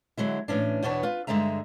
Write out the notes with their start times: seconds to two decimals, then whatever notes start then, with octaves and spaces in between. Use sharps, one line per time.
0.17 D3 F#3 G#3 E4
0.48 A2 E3 C#4 D4
0.82 E2 B2 B3 D4 C#5 A5
1.03 F4 B4
1.27 G2 D3 E3 G#3 E5 A#5